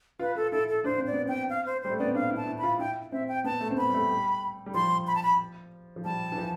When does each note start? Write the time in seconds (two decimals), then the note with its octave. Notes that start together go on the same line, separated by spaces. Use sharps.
0.19 F4 B4
0.36 F4 A4
0.52 E4 A4
0.69 A4
0.84 D4 C5
0.98 C4
1.07 D5
1.12 B3
1.25 C4 G5
1.50 F5
1.66 C5
1.83 G3 C5
1.91 A3
1.99 B3 D5
2.07 C4
2.15 D4 F5
2.31 E4
2.37 A5
2.48 E4
2.58 B5
2.63 F4
2.79 E4 G5
3.12 C4 E5
3.28 G5
3.44 B3 A5
3.61 A3
3.71 C4
3.77 B3 B5
3.89 G3
3.94 A3
4.10 G3
4.66 G3
4.74 F3 C6
5.07 B5
5.15 A5
5.23 B5
5.96 F3
6.05 G3 A5
6.32 E3
6.38 F3